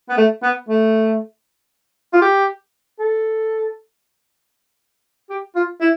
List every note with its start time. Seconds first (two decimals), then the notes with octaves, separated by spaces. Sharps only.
0.09 B3
0.17 A3
0.43 B3
0.69 A3
2.13 F4
2.22 G4
2.99 A4
5.30 G4
5.55 F4
5.81 E4